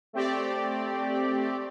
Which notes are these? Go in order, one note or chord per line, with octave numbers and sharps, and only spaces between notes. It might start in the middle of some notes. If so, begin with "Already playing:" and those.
A3 C4 G4 D5